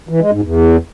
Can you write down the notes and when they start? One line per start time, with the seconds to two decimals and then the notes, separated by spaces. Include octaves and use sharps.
0.09 E3
0.20 G#3
0.31 G#2
0.42 E2